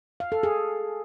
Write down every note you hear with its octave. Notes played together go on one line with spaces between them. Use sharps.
F5
A4
G#4